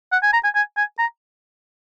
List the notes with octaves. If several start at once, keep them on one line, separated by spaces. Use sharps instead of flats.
F#5
G#5
A#5
G#5
G#5
G#5
A#5